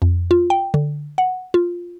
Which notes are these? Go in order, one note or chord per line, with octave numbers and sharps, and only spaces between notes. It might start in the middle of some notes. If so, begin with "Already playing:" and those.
F2
F4
G5
D3
F#5
F4